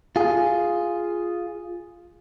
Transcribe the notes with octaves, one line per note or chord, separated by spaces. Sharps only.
F4 G#4